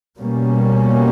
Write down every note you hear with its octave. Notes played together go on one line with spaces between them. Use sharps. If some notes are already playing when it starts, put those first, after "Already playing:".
B2 G3 A#3 C#4